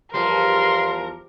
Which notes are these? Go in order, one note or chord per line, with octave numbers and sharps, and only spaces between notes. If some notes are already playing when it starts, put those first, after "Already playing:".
E2 F3 G3 A#4 C6